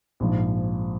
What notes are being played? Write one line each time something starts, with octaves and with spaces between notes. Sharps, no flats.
A#1 G#2 F3